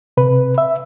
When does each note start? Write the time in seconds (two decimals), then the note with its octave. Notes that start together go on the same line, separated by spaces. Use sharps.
0.17 C3 B4
0.58 E5